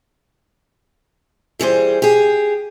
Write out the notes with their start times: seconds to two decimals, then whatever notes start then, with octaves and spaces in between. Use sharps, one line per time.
1.59 E3 G3 G#4 C5
2.02 G4 G#4